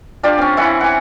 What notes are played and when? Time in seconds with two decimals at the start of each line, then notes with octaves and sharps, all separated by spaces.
0.23 D4 F4 G4 D5
0.38 C4 C#4
0.57 E3 E4 F#5
0.81 E3 F#5